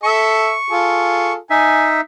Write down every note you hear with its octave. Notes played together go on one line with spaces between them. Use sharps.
A4 E5 C#6
F4 G#4 A4
D#4 E5 G#5